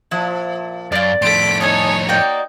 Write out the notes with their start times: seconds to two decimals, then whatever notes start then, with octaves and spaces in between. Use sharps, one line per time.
0.11 A#2 F3 E4
0.92 F#2 F4 A#4 D5
1.22 F2 A2 A4 C6 B6 D7
1.61 B3 D#4 A4 C#5 G#5
2.09 A#3 F#4 D5 D#5 G5